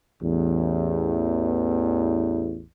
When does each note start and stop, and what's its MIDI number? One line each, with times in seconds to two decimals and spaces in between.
0.22 2.63 33
0.22 2.63 40